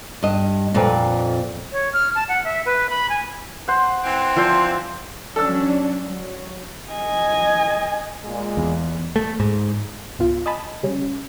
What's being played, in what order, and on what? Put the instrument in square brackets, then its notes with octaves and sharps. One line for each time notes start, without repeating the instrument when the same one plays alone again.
[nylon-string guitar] G2 D#5
F2 A#2 C4 B4
[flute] C#5
F6
A5
F#5
E5
B4
B5
G#5
[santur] C5 F#5
[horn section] E3 C4
[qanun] F3 [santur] C5 D5 E5
[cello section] F#3 C#4 D4 [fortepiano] A4 E6
[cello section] F#3
[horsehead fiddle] D#5 G#5
[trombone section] A#2 G#3
[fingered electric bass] E2
[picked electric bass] A3
G#2
[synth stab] G#1 C#2 B3 F4
D#5 G#5 A5 B5
C#3 G3 C#4